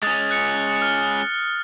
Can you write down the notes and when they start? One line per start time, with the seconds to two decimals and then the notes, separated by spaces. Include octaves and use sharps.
0.03 G#3 C#4 D#6 A6
0.31 F#6 C#7
0.82 F6